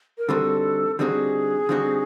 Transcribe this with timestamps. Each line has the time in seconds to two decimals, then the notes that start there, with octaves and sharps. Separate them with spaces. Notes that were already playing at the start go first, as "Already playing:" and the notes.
0.18 A#4
0.29 D3 G3 C4 D#4 F#4 A4
0.99 D3 G3 C4 D#4 F#4 G#4
1.69 D3 G3 C4 D#4 F#4